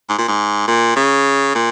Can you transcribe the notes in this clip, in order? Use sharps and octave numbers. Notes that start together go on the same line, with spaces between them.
G#2
A#2
G#2
A#2
C#3
A#2